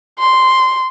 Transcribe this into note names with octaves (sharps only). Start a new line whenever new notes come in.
C6